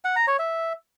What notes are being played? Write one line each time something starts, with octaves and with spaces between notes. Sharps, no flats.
F#5
A#5
C#5
E5